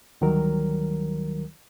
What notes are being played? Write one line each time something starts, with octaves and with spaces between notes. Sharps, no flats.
D2 D#3 F#3 G3 A#4